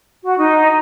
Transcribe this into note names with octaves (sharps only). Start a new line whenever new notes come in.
F#4
D#4